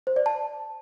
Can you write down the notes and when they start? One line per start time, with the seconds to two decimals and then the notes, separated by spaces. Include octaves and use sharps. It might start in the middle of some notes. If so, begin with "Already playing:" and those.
0.07 C5
0.16 D5
0.26 A5